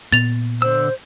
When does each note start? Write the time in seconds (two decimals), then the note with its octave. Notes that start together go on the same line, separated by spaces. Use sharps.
0.12 A#2 B3 A6 F7
0.62 D3 C5 E6